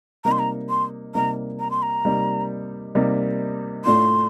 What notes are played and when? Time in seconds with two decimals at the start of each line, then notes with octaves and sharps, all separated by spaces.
0.24 C3 G3 A#3 D#4 A#5
0.32 C6
0.39 A#5
0.69 C6
1.15 C3 G3 A#3 D#4 A#5
1.60 A#5
1.71 C6
1.82 A#5
2.05 C3 G3 A#3 D#4
2.95 C3 G3 A#3 D#4
3.85 A2 A3 D4 F4 C6